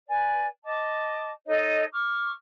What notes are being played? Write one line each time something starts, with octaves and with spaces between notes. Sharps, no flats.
B4 D5 G#5
D#5 A5 D6
D#4 A4 C#5 D#5
C#6 D6 F6